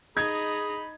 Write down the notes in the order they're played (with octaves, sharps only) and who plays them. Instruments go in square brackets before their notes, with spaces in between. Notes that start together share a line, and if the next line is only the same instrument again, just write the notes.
[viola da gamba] D#4 [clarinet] G#4 [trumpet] B5 [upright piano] G#6